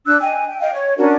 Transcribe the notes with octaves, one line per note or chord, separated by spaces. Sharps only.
D4 E6 F#6
D#5 G5 G#5
G5
D#5 F5 G5
C#5
C#4 D4 F#4 A#4